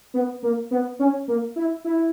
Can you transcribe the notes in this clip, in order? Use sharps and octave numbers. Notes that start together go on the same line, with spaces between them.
B3
A#3
B3
C#4
A#3
E4
E4